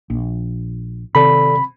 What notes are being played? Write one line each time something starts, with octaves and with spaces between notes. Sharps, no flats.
A#1
C3 D#3 A4 D5 B5